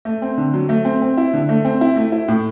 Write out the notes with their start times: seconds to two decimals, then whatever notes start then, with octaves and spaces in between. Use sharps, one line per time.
0.05 A3
0.22 C4
0.38 D3
0.54 F#3
0.69 A3
0.85 C4
1.02 C4
1.17 E4
1.34 D3
1.49 A3
1.65 C4
1.81 E4
1.96 A3
2.12 E4
2.28 A2